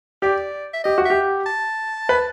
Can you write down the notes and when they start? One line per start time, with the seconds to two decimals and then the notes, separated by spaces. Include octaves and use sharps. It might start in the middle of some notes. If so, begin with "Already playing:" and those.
0.22 G4 D5
0.74 E5
0.84 G4 D#5
0.98 F#4
1.05 G4 E5
1.46 A5
2.09 B4